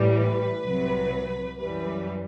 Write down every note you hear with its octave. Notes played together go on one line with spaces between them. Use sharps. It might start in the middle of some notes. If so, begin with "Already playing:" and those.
Already playing: A1 A2 E3 G3
B4
C2 C3 F#3
F#2 E3 G3 B4